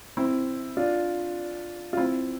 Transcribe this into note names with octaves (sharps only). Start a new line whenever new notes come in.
C4 E4
D4 F4
F4
C4 E4